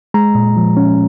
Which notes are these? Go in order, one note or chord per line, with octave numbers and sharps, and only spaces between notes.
G#3 A#5
A#2
F3
C#4